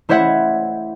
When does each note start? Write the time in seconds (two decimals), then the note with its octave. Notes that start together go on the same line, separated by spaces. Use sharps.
0.09 A3 E4 C5 C#5 E5 F#5